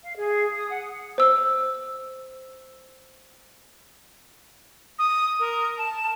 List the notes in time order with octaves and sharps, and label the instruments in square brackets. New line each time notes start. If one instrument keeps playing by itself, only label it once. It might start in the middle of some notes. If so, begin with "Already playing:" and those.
[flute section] F5
G#4
D#6
F#5
[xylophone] C5 E6
[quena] D#6
A#4
A5